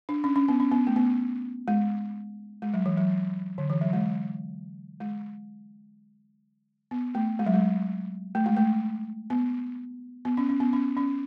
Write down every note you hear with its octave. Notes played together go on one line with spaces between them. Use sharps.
D4
C#4
C#4
B3
C#4
B3
A3
B3
G#3
G#3
F#3
E3
F#3
D3
E3
F#3
G#3
G#3
B3
A3
G#3
F#3
G#3
A3
G#3
A3
B3
B3
C#4
C#4
B3
C#4
C#4